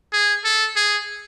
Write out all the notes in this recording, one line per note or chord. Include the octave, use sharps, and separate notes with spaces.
G#4
A4
G#4